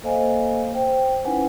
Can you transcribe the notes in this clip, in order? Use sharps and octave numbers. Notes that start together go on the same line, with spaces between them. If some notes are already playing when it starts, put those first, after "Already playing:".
A#3 A4 C5 D#5 F5 G#5
C5 G5
C#4 D#4 E4 B4 F#5 G#5